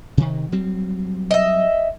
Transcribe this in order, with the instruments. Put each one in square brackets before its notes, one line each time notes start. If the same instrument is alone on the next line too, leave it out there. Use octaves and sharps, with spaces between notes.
[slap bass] C3 D#3
F#3 G3 C4
[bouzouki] D#5 E5